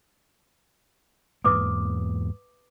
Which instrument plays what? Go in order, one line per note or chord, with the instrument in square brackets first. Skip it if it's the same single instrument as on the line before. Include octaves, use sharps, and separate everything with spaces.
[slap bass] E2 G#2 A#3 [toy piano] B4 D6 D#6